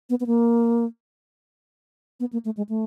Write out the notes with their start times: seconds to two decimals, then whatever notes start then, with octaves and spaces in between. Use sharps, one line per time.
0.10 B3
0.20 B3
0.27 A#3
2.20 B3
2.33 A#3
2.45 A3
2.57 G#3
2.69 A3